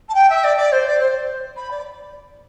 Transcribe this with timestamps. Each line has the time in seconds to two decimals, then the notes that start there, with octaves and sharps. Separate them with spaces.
0.08 A5
0.14 G5
0.29 E5
0.44 D5
0.57 D5
0.72 C5
0.86 D5
1.00 C5
1.56 B5
1.71 D5